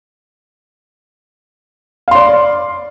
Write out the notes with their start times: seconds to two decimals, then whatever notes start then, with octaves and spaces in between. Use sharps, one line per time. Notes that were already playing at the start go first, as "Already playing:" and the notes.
2.08 F5
2.11 C6
2.15 D5